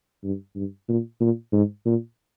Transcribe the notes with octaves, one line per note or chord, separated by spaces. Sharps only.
G2
G2
A#2
A#2
G#2
A#2